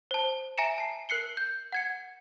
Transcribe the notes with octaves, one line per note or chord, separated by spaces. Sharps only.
C5 A5
E5 G#5 A#5 A#6 C#7 E7
A5 C7
A#4 F#6 C7 C#7 G7
G6
F#5 G#6 C#7